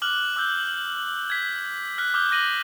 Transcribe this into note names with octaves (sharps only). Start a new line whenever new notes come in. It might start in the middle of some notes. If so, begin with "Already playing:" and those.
D6 F6 F#6 F#7
D6 E6 G6 G7
G#6 B6
F6 F#6 B6
D6 D#6 F6 G6 G7
D6 A#6 D#7 F#7 G7